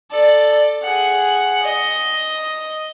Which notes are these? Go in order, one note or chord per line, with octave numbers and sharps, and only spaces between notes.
A4 D5
G#4 F#5
D#5